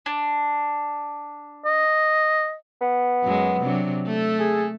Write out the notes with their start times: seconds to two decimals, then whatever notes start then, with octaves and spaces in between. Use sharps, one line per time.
0.06 D4
1.65 D#5
2.81 B3
3.24 F#2 F#3 G#3
3.61 C3 F#3 D4
4.07 A3 A4
4.39 G#4